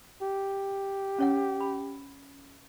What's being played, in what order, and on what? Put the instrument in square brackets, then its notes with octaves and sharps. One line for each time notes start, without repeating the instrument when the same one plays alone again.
[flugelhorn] G4
[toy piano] C#4 C#5 F#5
B5